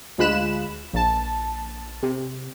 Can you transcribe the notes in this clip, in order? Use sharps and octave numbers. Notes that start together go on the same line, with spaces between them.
D2 G#3 F4 B5 F#6 E7
A#1 A5
C3